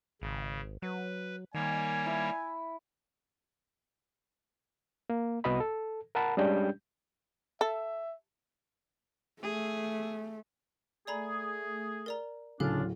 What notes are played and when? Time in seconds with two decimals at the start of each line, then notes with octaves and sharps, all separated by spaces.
0.22 G#1 C#3
0.82 F#3 B4
1.54 D#3 G3 A#3 C#5 G#5
2.06 E4
5.10 A#3
5.44 C2 B3 F#4 D#5 B5
5.60 A4
6.15 A#4 F#5 A5 B5
6.37 G3 G#3 C#4 D4 G4 G6
7.61 A4 E5
9.42 A3 G#4
11.07 A3 G#4 D5 A#5 B5
12.06 A#4 D5 A#5
12.60 D1 C#3 C#4 D4 F4 A4 F5